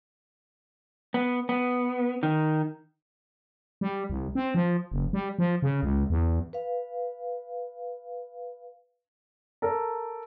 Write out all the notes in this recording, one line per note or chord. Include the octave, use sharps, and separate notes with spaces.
B3
B3
D#3
G3
C2
C4
F3
F#1
G3
F3
C#3
C#2
E2
B4 F5
A4 A#4